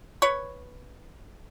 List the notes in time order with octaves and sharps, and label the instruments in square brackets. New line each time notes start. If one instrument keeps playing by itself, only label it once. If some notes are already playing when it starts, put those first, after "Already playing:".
[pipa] B4 C#5